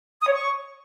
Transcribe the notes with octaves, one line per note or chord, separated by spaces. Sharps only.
D#6
C#5
C#6